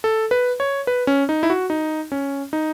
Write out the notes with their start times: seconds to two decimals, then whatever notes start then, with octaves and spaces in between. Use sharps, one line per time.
0.04 A4
0.31 B4
0.60 C#5
0.87 B4
1.07 C#4
1.29 D#4
1.43 E4
1.50 F#4
1.70 D#4
2.12 C#4
2.53 D#4